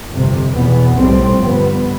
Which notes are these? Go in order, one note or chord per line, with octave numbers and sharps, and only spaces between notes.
G1 F2 C3
E2 B2 B3
B1 A2 G3 C4
G1 G2 F3 B3